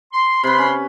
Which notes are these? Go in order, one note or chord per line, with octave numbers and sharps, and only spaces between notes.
C6
C3 B4 B5 C6
C#4